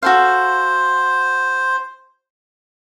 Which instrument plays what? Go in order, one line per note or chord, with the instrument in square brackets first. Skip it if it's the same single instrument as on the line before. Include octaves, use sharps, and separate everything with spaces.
[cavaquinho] F#4 A4 F5 [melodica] C5